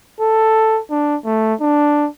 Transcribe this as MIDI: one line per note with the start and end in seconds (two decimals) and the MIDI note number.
0.21 0.81 69
0.91 1.17 62
1.25 1.54 57
1.61 2.08 62